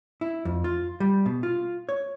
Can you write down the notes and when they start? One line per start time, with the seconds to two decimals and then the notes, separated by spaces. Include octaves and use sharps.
0.21 E4
0.45 F2
0.64 F4
1.00 G3
1.26 B2
1.43 F4
1.89 C#5